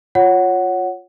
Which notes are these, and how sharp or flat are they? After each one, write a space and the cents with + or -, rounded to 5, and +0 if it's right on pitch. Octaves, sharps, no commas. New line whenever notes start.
F4 +10 C#5 +0 F#5 +0